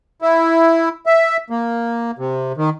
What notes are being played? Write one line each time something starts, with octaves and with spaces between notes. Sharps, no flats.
E4
E5
A#3
C3
D#3